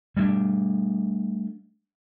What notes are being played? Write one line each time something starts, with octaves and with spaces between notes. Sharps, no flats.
G3 A3 B3 D4